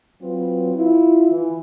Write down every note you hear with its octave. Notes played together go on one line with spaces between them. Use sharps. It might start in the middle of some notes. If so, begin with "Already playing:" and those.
F#3 C4 F4 B4
E4 F4
E3